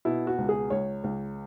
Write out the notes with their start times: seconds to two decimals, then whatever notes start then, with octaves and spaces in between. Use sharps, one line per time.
0.05 B2 E4
0.27 F#4
0.38 C#2
0.49 G#4
0.70 C#2 C#5
1.04 C#2